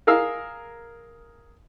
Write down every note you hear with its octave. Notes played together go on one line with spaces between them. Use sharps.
G#4 A#4 F5 E6